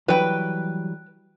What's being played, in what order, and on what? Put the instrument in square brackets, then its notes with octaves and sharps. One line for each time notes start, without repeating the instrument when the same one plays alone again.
[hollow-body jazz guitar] E3 F#3 G3 [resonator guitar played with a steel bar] B4 G5